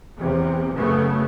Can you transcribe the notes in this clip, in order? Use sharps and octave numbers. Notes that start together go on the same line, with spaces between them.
E2 C3
F#2 C#3 A3 B3